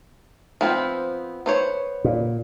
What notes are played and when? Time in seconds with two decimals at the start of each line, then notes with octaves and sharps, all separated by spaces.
0.61 F3 B3 C4
1.46 B3 C5 C#5
2.04 A#2